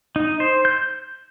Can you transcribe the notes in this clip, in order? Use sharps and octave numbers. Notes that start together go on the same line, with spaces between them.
D#4
C5
G6